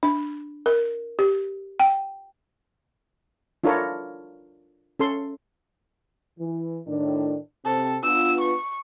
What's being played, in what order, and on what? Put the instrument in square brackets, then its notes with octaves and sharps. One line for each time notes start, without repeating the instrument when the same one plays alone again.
[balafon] D4
A#4
G4
G5
[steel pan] D4 E4 F4 A4 A#4 C#5
C#4 A4 C6
[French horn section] E3
A2 D#3 D4
[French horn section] C3 C4 [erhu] A4
[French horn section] B3 D4 F4 [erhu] E6
[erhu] C#6